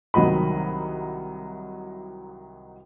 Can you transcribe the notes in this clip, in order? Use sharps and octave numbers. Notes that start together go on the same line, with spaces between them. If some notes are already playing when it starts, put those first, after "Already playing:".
C2 D#3 F#3 D#5 B5